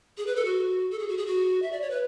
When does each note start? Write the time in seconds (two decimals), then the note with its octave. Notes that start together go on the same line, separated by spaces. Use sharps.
0.18 G#4
0.27 B4
0.36 A4
0.45 F#4
0.91 A4
0.99 G#4
1.08 F#4
1.17 G#4
1.27 F#4
1.62 E5
1.72 D5
1.82 C#5
1.90 B4